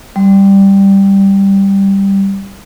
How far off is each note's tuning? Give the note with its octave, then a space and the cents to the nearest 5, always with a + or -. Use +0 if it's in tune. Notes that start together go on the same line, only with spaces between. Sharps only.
G3 +0